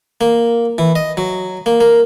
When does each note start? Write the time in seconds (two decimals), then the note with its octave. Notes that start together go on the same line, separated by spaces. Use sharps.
0.21 A#3
0.78 E3
0.96 D#5
1.17 F#3
1.66 A#3
1.81 A#3